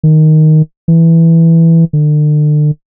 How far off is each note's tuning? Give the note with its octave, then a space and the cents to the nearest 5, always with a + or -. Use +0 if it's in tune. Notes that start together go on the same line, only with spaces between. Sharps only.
D#3 +0
E3 +0
D3 +35